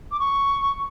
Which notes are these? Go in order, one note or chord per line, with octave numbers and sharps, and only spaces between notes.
D6
C#6